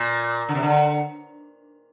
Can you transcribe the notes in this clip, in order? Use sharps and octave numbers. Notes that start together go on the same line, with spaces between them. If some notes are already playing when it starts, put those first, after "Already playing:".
Already playing: A#2
D3
C3
D3